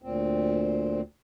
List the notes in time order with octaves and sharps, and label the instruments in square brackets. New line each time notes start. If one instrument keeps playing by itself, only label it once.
[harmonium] D2 A#2 C4